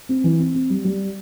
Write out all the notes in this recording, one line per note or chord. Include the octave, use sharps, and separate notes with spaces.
C4
E3
C4
C4
G3
G3